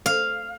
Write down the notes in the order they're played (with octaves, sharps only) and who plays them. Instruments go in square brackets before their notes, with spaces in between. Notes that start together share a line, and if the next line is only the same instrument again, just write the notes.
[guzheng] F5